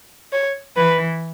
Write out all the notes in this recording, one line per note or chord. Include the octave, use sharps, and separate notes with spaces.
C#5
E3 B4